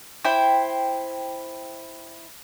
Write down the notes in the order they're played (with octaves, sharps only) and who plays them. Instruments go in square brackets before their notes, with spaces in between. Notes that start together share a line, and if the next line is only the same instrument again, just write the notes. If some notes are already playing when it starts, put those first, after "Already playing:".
[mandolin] E4 C5 G5